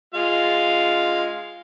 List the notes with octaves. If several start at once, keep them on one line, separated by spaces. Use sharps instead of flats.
G#3 F4 F5